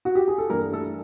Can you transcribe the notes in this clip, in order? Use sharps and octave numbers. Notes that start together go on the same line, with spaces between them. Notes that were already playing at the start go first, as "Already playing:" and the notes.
F#4
G4
G#4
A4
G2 E3 G3 A#3 A#4
A3 A4